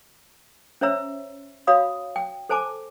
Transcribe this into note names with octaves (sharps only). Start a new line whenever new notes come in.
C#4 C5 C#5 E5 A#5 E6
F#4 C#5 F5 B5 D#6
G5
A4 C5 G#5 A5 D6